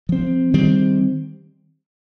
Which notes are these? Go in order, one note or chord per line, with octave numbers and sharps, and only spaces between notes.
F3 C4
D#3 G3 C4